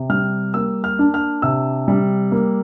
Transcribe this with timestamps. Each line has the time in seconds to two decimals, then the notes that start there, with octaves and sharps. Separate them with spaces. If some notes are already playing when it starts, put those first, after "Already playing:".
Already playing: C3
0.10 G3 F6
0.54 A#3 E6
0.84 F6
0.99 D4
1.14 F6
1.42 C3 E6
1.88 G3
2.32 A#3